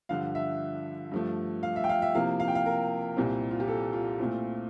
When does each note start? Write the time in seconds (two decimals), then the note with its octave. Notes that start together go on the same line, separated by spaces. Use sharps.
0.09 G2 D3 F3 F5
0.35 E5
1.12 G2 F3 A3
1.63 F5
1.76 E5
1.84 G5
1.89 F5
2.02 E5
2.15 C3 F3 A#3 E4 F5
2.40 F5
2.48 G5
2.55 F5
2.66 A#4
3.17 C2 A#2 G3 C4 E4
3.51 F4
3.60 G4
3.68 A4
3.93 F4
4.19 A#2 A3 C4 E4